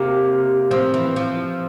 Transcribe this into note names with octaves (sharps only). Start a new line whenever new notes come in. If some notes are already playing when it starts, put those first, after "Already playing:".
Already playing: C3 A#3
F3 C4
E3
F3